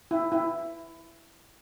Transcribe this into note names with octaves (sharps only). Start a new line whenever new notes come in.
E4
E4